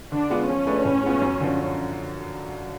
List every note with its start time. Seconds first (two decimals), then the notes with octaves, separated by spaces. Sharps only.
0.12 D3 D4
0.30 G#3 B3 F4
0.48 F3 C#4
0.67 A3 D4 G#4 B4
0.85 A2
1.04 G#3 B3 F4
1.21 F#2
1.41 D3 F3